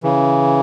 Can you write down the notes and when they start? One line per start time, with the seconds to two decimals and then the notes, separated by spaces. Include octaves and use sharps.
0.03 C#3 E3